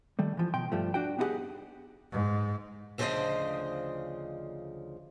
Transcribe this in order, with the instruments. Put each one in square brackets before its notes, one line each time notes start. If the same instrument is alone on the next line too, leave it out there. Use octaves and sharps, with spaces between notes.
[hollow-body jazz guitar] D#3 G3 A3
E3 F3
B2 G5 C6
G2 F3 A3
D4 F#4 G5
B3 D#4 E4 G4 G#4 F#5
[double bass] G#2
[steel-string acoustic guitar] D2 C#3 F3 C5 D5 D#5